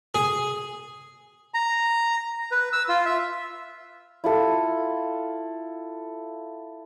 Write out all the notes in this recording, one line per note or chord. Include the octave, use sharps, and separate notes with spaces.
G#4
A#5
B4
E6
F4
E5
E4 F4 A4